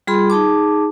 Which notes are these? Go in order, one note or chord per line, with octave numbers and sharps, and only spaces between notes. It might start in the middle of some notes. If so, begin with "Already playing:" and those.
G3 F4 G#4 B5 C6
D#4 G#4 A5 D6